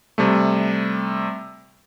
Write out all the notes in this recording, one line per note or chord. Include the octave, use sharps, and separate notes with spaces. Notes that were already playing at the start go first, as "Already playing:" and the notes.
C3 G3 A3